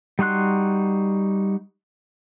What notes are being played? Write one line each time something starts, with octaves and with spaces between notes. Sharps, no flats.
G3 D#4 F#4 C6 F#6